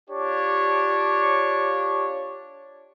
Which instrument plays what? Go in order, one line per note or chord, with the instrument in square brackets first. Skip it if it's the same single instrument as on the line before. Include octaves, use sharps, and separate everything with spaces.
[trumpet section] D4 F4 G4 C#5